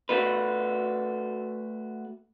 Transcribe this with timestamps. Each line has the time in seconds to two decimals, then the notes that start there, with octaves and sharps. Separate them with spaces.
0.09 A3 F#4 B4